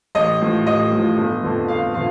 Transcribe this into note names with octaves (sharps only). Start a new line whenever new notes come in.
A1 D#5
A2 F3
A1 D#5
A2 F3
G1
F2 D3 F3
G1 F5
D3 F3 F5